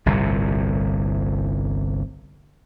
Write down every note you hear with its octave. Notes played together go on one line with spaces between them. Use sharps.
G1 C2 A2 C3